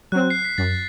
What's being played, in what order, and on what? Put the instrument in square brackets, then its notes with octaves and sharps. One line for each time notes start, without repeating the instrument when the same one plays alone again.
[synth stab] F#3 C4 [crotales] F#6
[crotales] C7
B6
[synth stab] F#2 [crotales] A6